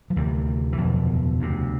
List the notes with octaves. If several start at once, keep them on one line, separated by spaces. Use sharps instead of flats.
F3
D2 C3 E3
E3
F#1 E2 B2 F3
D2 C3